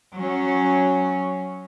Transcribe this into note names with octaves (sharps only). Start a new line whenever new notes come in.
F#3 C#4